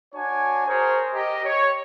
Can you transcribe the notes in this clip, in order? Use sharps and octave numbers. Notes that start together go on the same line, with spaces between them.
D4 F#4 C#5 G#5
G#4 A#4 C5 C#5
G4 A#4 D#5
C#5